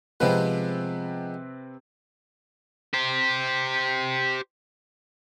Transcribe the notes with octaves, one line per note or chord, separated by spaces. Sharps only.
C3 F3 G#3 B3 C4 B4
G4 C5